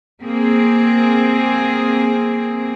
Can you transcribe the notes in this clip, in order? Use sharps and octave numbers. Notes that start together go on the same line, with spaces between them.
A#3 C4 G#4